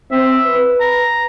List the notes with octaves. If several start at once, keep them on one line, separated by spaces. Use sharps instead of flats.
C4 E5
B4
A#5